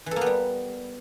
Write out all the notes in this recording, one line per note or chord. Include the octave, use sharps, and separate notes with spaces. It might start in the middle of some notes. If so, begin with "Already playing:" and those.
E3
A4
A#3
B3
G3